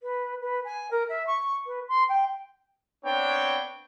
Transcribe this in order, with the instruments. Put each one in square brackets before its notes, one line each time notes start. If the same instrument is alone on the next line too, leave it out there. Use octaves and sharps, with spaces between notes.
[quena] B4
B4
G#5
A#4
E5
C#6
B4
C6
G5
[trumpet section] B3 C4 D4 C#5 G5